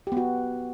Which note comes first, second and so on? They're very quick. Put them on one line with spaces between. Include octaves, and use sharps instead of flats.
G4 B3 F#4